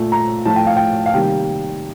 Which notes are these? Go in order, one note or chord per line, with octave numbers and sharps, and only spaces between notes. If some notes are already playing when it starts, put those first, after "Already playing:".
Already playing: A#2 A3
A#5
A2 F3 A3 A5
G5
F5
G5
F5
C3 D#3 G3 A#3 G5